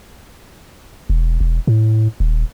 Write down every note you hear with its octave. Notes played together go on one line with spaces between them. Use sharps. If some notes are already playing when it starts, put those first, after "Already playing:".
E1
E1
A2
D#1